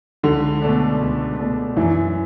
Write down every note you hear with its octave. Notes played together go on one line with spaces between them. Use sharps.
C#2 D3
B2 A3 D4
C#2
B2 A3 D4
F#2 E3